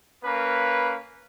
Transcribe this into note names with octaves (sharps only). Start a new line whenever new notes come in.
A#3 C#4 B4